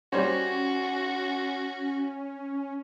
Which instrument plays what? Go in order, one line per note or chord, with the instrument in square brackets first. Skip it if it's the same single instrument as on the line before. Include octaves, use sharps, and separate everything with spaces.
[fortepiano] G3 C5 C#5 [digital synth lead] C#4 [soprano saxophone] F#4